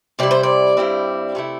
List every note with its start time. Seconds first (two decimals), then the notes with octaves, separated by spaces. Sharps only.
0.19 C3 G3 E4 D5
0.31 C5
0.43 D5
0.77 G2 G3 C4 E4
1.35 C3 A3 E4